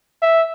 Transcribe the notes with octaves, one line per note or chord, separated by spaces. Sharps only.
E5